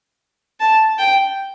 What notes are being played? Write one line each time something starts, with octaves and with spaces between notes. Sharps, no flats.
A5
G5